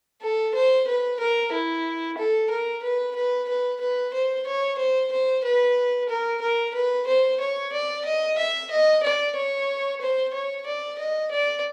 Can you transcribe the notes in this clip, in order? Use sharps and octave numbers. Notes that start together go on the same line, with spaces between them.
A4
C5
B4
A#4
E4
A4
A#4
B4
B4
B4
B4
C5
C#5
C5
C5
B4
A#4
A#4
B4
C5
C#5
D5
D#5
E5
D#5
D5
C#5
C5
C#5
D5
D#5
D5